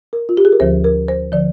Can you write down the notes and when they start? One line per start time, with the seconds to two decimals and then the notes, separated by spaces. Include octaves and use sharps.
0.13 A#4
0.29 F4
0.37 G4
0.45 G#4
0.52 A#4
0.60 D2 D3 F3 C5
0.84 A#4
1.08 C5
1.32 D3 F3 D5